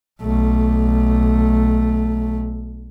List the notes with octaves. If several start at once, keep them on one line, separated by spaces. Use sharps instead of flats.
B1 A3